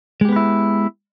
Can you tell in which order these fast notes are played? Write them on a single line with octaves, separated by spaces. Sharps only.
G#3 G4 B3 B4 E4